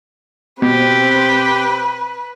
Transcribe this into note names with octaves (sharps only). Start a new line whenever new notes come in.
B2 C4 G4 B4